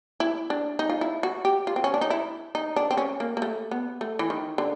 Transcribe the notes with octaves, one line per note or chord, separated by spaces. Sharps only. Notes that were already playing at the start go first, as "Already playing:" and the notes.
E4
D4
D#4
F4
E4
F#4
G4
F4
C4
C#4
D4
D#4
E4
D#4
D4
C4
C#4
A#3
A#3
A3
B3
A3
E3
D#3
D3